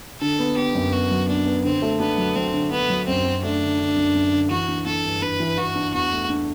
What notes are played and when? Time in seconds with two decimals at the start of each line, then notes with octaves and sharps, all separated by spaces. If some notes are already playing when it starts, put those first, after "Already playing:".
0.21 D3 A4
0.39 B3
0.57 B3 G4
0.75 F#2
0.92 B3 F#4
1.11 F#3
1.28 B3 D4
1.46 B3
1.64 D3 C4
1.82 A3
2.00 B3 D4
2.18 F#3
2.35 F#3 C4
2.53 D3
2.71 B3 D4
2.90 F#3
3.07 F#2 C4
3.25 F#2
3.43 A3 D4
3.61 D3
3.79 D3
3.96 F#2
4.15 F#2
4.33 D3
4.51 E3 F#4
4.68 D4
4.86 D4 A4
5.04 G2
5.22 D4 B4
5.40 E3
5.57 E3 F#4
5.75 D4
5.93 E2 F#4
6.11 A3
6.30 D4